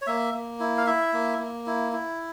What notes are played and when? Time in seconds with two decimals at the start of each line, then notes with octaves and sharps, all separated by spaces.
0.02 C#5
0.07 A#3 E5
0.34 A#3
0.60 E4
0.78 F5
0.86 E4 E5
1.13 A#3
1.39 A#3
1.66 E4
1.92 E4